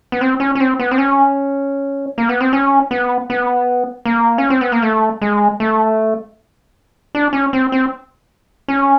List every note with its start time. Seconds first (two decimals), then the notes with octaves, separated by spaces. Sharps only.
0.12 B3
0.21 C4
0.40 C#4
0.55 C#4
0.60 C4
0.80 B3
0.91 C4
0.98 C#4
2.18 A#3
2.29 B3
2.41 C4
2.53 C#4
2.91 B3
3.30 B3
4.05 A#3
4.38 C#4
4.50 C4
4.61 B3
4.72 A#3
4.82 A3
5.22 G#3
5.60 A3
7.15 D4
7.33 C#4
7.53 C4
7.72 C4
8.68 C#4